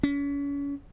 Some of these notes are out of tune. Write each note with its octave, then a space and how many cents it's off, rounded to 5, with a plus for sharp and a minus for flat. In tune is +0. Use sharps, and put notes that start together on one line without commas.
C#4 +35